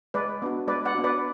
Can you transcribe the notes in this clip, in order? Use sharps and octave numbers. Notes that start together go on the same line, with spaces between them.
G#3 B4 D5
B3 D4 F#4
G#3 B4 D5
D5 F#5
B3 D4 F#4
B4 D5